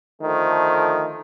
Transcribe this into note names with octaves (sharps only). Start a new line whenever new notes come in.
D3 D#3 F3 A3